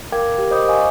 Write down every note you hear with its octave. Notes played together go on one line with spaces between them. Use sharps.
A#4 F5 G5 D6 G#6
G4 A#4 G5
C5 D#5 B5 D6 D#6 G6
C5 D#5 F5 G#5 C#6